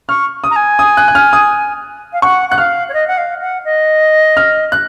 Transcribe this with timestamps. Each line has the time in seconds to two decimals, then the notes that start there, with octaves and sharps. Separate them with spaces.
0.09 C#6 F6
0.44 D#6
0.50 A#5
0.56 G#5
0.79 D#6
0.97 F#6
1.08 F#6
1.15 F6
1.33 D#6
2.13 F5
2.22 F#5 C#6
2.49 F#5 F#6
2.58 F5 F6
2.89 C#5
2.93 D#5
3.07 F#5
3.17 F5
3.41 F#5
3.65 D#5
4.37 F6
4.72 F#6